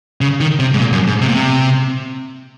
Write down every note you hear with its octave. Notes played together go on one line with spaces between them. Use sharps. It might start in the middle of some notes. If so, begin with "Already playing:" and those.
C#3
D#3
C3
G#2
A#2
F#2
G#2
C3
A#2
C3